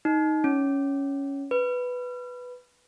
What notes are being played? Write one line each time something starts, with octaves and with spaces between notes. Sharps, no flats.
D#4
C#4
B4